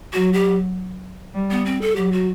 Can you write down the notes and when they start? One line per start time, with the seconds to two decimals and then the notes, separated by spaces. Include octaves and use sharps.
0.13 F#3 F#4
0.33 G4
1.35 G3
1.51 B3
1.65 C4
1.82 A4
1.96 F#3 G4
2.12 F#4